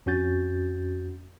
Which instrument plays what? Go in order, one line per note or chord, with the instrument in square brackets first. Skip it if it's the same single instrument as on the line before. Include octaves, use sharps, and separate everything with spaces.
[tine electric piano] F2 C#4 F#4 G6 A6